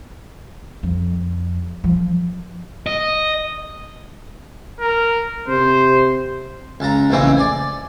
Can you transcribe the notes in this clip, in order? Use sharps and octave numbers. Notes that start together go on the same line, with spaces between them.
F2
F3
D#5
A#4
C3 C5
C#2 A5 A#5
A#1 A2 C#3 E3 C4 D#5
D5 G#5